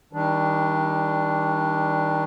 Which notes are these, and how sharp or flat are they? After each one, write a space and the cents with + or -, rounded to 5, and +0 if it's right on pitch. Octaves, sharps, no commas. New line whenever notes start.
D#3 +30 G3 +0 D4 +0